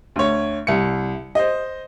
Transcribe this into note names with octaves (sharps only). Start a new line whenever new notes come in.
D2 C#5
C2 C#7
C5 D#5